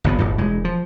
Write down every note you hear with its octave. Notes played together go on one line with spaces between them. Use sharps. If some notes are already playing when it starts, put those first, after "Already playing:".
G1 D2 A#2 B3
D1 G1 G2
E1 G#3
F3